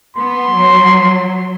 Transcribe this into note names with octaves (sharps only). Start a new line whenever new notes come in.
B3 C6
F#3